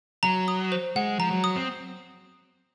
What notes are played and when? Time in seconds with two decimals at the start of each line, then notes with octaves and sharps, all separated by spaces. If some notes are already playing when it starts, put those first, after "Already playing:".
0.23 F#3 A#5
0.48 D#6
0.72 C5
0.96 G#3 F#5
1.19 F3 A#5
1.31 F#3
1.44 D#6
1.56 C4